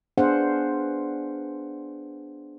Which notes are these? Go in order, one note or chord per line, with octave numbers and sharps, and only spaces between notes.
B3 D4 G#4 C5 F5 F#5